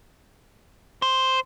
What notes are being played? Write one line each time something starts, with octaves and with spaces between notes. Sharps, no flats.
C5